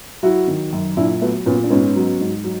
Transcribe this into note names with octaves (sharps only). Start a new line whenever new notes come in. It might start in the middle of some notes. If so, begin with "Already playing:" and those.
F#3 E4 F#4
D#3
F#2
A#2 D4 E4
F#3 A3 B3
A#2 B3 C#4
D4
G#2 B3 C#4
F#3
G#2
F#3